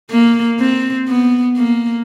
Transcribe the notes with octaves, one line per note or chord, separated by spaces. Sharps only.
A#3
C4
B3
A#3